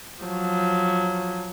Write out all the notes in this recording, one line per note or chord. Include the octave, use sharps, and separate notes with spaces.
F3 F#3